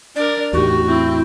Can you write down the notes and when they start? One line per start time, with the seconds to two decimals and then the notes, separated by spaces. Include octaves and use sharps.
0.16 D4 A#4 D5
0.53 E2 A2 D#4 F#4 G4
0.86 C4 E4